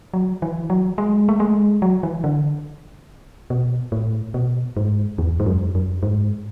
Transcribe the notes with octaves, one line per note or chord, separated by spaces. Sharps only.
F#3
E3
F#3
G#3
A3
G#3
F#3
E3
D3
B2
A2
B2
G#2
E2
G#2
F#2
F#2
G#2